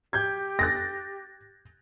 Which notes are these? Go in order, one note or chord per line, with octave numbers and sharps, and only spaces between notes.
G4 G6 G#6
F#6 A6 A#6